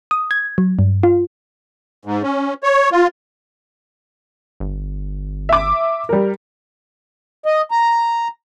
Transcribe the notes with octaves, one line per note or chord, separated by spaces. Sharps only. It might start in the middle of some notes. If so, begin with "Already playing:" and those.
D#6
G#6
F#3
G2
F4
G#2
C#4
C#5
F4
G1
E5 D6
G3 A#4
D#5
A#5